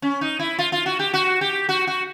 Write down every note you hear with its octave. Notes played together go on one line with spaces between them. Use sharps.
C#4
D#4
E4
F4
F4
F#4
G4
F#4
G4
F#4
F#4